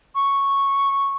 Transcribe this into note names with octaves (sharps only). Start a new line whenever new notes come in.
C#6